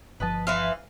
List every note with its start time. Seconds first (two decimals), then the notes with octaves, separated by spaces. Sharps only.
0.20 G1 F3 B4 D#5 A5
0.47 E3 B4 E5 F5 C6